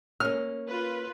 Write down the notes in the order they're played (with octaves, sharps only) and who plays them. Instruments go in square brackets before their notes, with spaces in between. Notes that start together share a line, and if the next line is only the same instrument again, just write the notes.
[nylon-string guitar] A#3 C#4 [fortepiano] F6
[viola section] F4 B4